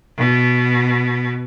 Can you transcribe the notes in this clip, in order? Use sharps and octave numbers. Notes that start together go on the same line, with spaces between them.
B2